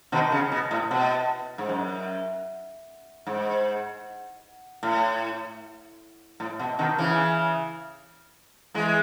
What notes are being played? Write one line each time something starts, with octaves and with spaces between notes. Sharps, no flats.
B2 D#3
C#3
B2
A2
B2
G#2
F#2
G#2
A2
A2
B2
B2 D#3
C#3 E3
E3 G#3